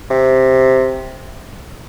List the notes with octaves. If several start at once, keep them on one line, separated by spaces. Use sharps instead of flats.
C3